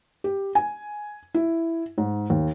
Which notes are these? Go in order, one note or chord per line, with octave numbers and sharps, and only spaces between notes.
G4
G#5
E4
G#2
D#2